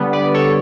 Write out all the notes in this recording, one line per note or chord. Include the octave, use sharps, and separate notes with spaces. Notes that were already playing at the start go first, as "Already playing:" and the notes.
Already playing: D3 G3 B3
B4 D5
A4 C#5